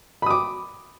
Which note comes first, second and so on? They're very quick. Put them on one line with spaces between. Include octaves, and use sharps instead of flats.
B5 D#6 D6